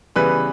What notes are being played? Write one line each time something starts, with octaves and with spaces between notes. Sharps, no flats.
C#3 E3 G3 B3 B4 B5